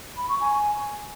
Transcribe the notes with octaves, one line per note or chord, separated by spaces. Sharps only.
B5
C#6
G#5